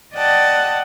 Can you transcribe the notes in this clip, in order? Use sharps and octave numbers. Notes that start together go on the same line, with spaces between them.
D5 D#5 F#5 G5 A5